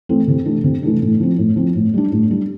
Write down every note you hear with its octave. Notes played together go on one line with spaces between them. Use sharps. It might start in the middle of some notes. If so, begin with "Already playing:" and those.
E3 A3 C4
C3
E3 A3 D4
C3
E3 A3 D4
A2
F3 C4
A2
F3 C4
A2
G3 D4
A2
G3 D4